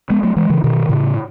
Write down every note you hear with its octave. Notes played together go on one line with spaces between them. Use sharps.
G#3 B3
F#3 A3
E3 G#3
C#3 E3
B2 D#3
A2 C#3